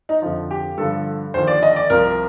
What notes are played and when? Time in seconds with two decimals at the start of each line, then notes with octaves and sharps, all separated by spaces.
0.09 D#4
0.22 F2 D3 F3
0.51 G4
0.78 G2 D3 F3 A4
1.34 D#2 D3 F3 C5
1.47 D5
1.63 D#5
1.76 D5
1.90 C2 C3 F3 A#4